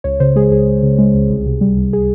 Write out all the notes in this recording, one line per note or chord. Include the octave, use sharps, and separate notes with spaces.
C#2 C#5
C#3 C5
G#3 G#4
C#2 G#4
C#2
C#3
G#3
C#2
C2
C3
G3
C2
G#4